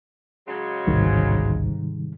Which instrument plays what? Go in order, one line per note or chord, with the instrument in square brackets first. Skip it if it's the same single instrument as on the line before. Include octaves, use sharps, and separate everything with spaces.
[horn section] C#3 F#3 G#3
[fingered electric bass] A1 D2 [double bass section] G#2 [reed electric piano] C3 D#3 G3